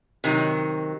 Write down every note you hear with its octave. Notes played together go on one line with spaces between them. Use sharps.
C3 D#3 F#3